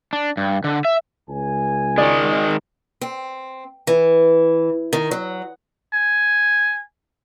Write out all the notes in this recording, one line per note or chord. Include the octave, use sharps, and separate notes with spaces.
D4
G2
D3
E5
C#2 G#5
D#3 G#3 D5
C4
E3
D#3
F#3
G#5